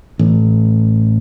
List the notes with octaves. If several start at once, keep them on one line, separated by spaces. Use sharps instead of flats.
A1